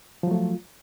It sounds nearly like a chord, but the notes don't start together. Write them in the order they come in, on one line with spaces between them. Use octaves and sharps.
F3 F#3 A3 F4